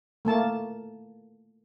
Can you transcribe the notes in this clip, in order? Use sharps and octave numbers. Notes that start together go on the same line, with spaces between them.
A3 A#3 A5